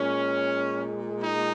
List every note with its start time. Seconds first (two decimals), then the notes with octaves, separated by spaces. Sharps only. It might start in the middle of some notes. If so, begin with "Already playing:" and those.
Already playing: A#2 G#3 C#4
1.21 D#4